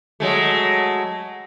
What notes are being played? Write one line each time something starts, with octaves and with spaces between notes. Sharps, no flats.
F#3 G#3 A3